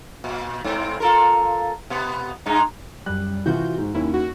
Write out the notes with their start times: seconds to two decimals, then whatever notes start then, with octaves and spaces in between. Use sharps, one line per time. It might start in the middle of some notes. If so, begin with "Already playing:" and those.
0.24 A#2
0.64 G#2 C4
1.00 F4 A4 A#4
1.90 B2 B3
2.46 G2 G#3 D#4
3.06 F#2 G3 F#6
3.46 C3 E3 F4 F#4 G6
3.78 G#2
3.95 D#2 C#4 E4
4.13 F#4